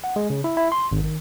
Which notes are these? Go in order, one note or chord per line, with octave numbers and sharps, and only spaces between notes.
F#5
G#3
C#3
E4
E4
C6
G#1
D#3